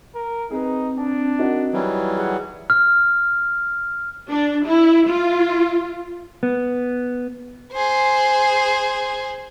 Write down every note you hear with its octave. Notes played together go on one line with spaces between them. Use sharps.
A#4
C4 D#4 G#4 B4
D4 A5
D#4 F#4 A#4
E3 F#3 G3
G#4 F#5
F6
D4
E4
F4
B3
G#4 C5